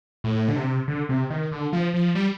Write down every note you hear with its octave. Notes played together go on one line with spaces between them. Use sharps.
A2
D3
C3
D3
C3
D#3
D3
F3
F3
G3